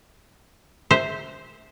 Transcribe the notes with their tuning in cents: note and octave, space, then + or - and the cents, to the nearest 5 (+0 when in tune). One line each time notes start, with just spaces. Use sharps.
C5 +0 E5 -15